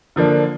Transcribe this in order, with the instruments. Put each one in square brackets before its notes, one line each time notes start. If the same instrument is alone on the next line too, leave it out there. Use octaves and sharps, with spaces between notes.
[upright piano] D3 F3 A#3 D4